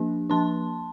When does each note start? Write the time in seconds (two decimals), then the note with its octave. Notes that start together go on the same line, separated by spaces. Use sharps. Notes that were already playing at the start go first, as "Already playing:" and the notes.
Already playing: F3 A#3 D4
0.30 F3 A#3 D4 A5 C6